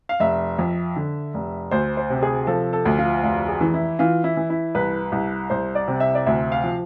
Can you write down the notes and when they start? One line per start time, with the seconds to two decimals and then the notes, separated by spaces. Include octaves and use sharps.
0.09 F5
0.20 F1 E5
0.59 F2
0.96 D3
1.34 F1
1.71 D2 C5
1.97 C5
2.10 C3
2.23 G#4
2.47 F3 A4
2.73 A4
2.85 D2
2.99 F4
3.23 F1 F4
3.48 G#4
3.61 E3
3.74 E4
3.99 E3 F4
4.24 E4
4.37 E3
4.50 E4
4.75 C2 B4
5.12 C2
5.50 C2 C5
5.75 D5
5.88 C3
6.00 E5
6.15 D5
6.26 D2 E5
6.52 F5
6.64 F3